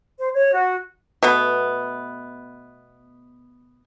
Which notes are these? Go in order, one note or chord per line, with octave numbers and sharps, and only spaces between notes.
C5
C#5
F#4
B2 A3 B3